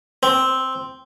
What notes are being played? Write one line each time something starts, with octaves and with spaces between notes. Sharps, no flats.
C4